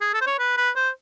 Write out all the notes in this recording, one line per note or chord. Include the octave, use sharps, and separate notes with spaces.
G#4
A4
C5
C#5
B4
B4
C5